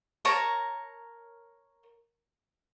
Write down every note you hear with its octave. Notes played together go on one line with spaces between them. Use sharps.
A#4 C#5 A5 A#5